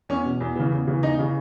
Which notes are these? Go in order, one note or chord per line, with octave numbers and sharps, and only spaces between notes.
E2 C#4
B2
E2
C#3 E3
E2
C#3 E3
E2 D#4
C#3 E3